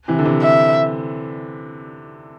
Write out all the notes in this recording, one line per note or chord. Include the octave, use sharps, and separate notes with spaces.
C3 E3
D3
C3 E3
E5